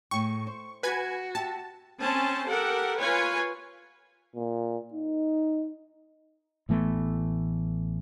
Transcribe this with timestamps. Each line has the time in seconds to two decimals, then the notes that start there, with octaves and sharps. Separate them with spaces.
0.11 A2 G#4 G5 C#6
0.47 C5
0.83 F#4 B4 G#5 G#6
1.35 G4 E5 A5
2.00 C4 C#4 C5 A5
2.47 G4 A4 A#4 F#5
3.00 F4 B4 C#5 G#5
4.35 A#2
4.93 D#4
6.69 A1 E3 A3 B3